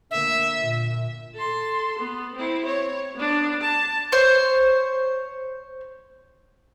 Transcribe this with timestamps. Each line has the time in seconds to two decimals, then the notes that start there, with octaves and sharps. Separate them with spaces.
0.11 D3 A#3 E5
0.58 A#2
1.34 A4 C6
1.99 B3
2.35 C4 E4
2.66 C#5
3.15 B3 D4
3.61 A5
4.12 C5 C#5